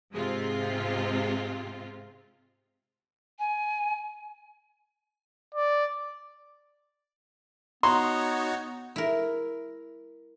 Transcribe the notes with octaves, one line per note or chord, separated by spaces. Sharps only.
G#2 C3 G#3 C4 F4
G#5
D5
B3 D#4 F#4 C#5 A#5 C6 C#6
E4 A#4